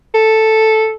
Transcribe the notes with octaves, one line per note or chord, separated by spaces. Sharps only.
A4